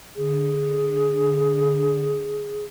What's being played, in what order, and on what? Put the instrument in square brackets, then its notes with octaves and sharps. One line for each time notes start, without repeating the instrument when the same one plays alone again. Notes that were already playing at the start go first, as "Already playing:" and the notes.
[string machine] D3 [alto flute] G#4